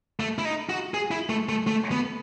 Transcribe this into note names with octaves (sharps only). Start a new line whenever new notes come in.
A3
E4
D#4
F#4
G#4
E4
A3
A3
A3
B3